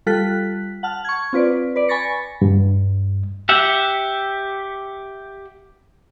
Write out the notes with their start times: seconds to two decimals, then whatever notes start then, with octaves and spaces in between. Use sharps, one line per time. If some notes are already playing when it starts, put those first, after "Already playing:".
0.06 G3 F4 A4 F#6 B6
0.83 F#5 A5 F6
1.05 C#6 G#6
1.33 C4 F4 B4 D5
1.76 B4 D5
1.88 G#5 B5 C#6 A6 A#6 C#7
2.42 G2
3.49 G4 E5 F#5